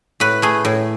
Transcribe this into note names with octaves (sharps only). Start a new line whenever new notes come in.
A2 B4
A3 G#4
A2